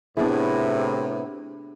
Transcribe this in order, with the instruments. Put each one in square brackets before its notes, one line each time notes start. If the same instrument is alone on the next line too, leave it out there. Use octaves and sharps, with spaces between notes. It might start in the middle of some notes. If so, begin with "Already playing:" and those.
[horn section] A2 C3 [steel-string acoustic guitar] B3 E4 [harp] D4 G#4